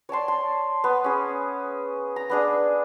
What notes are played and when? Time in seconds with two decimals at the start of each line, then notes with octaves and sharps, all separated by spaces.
0.09 C#5 D5 A5 C6
0.28 A5
0.84 B3
1.04 C#4 G#4
2.16 A#5
2.30 B3 D4 G#4